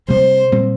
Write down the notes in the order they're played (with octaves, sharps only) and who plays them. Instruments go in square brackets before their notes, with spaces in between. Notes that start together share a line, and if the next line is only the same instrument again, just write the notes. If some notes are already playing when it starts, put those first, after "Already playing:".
[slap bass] C3 G3 A#3 [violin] C5
[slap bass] A#2 G3 C4